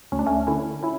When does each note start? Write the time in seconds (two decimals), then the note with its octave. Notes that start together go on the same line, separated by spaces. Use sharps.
0.12 D2 C#4
0.19 D4
0.26 A3 C#4
0.47 D3 C#4 E4
0.83 C#4 E4